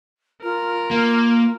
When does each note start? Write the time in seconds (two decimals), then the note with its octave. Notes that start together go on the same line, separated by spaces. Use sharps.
0.43 F4 A#4
0.91 A#3